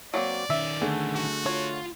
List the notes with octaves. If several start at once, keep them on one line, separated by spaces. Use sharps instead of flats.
F#3 A#3 C4 D5
D#3 C#4 E5
D3 A3 G#4
F#4
F4 C#5